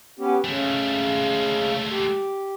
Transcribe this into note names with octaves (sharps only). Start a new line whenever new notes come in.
B3 C#4 G4
C#3 G#3 A3
G4